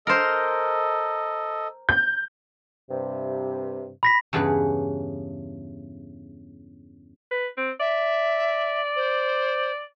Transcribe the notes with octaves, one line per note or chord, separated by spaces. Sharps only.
A4 A#4 C5 D#5
G6
G2 C3
B5 A#6 B6
E2 G2 C#3 G#4 B4
B4
C4
D5 E5
C5